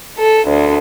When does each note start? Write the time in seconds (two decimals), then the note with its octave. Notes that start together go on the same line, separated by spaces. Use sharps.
0.17 A4
0.49 D2